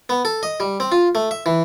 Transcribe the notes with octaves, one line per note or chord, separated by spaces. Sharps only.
B3
A4
D#5
G3
C4
F4
A3
E5
E3